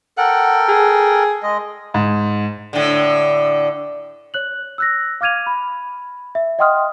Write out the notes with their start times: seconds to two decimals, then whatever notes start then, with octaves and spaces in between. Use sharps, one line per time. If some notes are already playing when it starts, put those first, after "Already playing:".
0.18 A4 A#4 F#5 G5
0.69 G#4
1.43 G#3 D#5
1.94 G#2
2.73 A2 D3
4.34 C#5 F#6 F#7
4.78 E6 F#6 A#6
5.21 F5 D6 F6 G#6 D#7 F7
5.46 B5
6.35 E5
6.59 D#5 F#5 G5 C6 D#6 F6